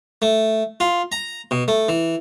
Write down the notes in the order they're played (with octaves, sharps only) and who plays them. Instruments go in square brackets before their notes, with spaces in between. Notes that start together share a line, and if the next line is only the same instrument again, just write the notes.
[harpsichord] A3
F4
A#5
B2
A3
E3